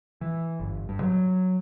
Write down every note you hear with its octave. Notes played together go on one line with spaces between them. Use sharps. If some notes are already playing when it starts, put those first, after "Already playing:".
E3
G1
G2
F#3